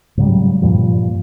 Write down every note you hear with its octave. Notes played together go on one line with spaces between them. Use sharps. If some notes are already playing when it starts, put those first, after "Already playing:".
G#2 C#3 F#3 G3
G2 A#2 F3 G3